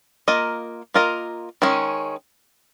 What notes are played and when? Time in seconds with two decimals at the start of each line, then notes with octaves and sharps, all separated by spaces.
0.28 A#3 F4 A#4 D#5
0.94 A#3 F4 A#4 D#5
1.62 D#3 G#3 C#4